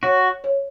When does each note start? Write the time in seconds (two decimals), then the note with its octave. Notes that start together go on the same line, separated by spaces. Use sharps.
0.03 F#4 C#5
0.44 C#5